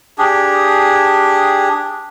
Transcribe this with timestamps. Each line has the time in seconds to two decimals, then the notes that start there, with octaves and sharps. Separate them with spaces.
0.18 D4 G4 G#4